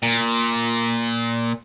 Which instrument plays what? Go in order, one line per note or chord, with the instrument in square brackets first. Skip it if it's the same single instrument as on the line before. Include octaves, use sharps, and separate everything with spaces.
[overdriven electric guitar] A#2